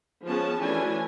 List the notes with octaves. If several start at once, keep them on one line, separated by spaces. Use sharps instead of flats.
F3 G#3 B3 C#4 G#4 A5
E3 F#3 A3 C#4 D4 G#5